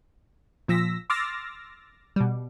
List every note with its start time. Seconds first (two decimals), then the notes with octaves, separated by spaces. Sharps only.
0.68 A#2 F3 E6 A#6 B6
1.10 C6 D6 E6 F6 A6 A#6
2.16 B2 G3